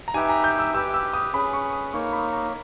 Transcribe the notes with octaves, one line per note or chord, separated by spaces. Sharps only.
A#5
D#4 G4 B4 E5 G5 G#5
A#5
G6
E6
G4 B4 G5 E6
E6
D#6
C#4 G#4 B4 B5
C#6
D#6
A#3 D#4 A#4 C#5 C#6
B5
A#5